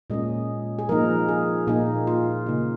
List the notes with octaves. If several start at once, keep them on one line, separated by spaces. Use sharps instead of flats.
A#2 G#3 C#4 D#5
G#4
F3 A#3 D#4 A#4
G#4
A#2 A#3 D#4 G#4
F4
C#3 A#3 D#4